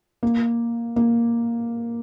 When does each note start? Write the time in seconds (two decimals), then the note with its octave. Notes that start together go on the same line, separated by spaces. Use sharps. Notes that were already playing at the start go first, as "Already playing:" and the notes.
0.23 A#3
0.96 A#3